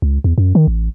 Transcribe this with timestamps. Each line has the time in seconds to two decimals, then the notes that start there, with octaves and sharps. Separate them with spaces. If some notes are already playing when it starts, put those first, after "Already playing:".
0.02 C#2
0.24 E2
0.38 F#2
0.55 D#3
0.67 A1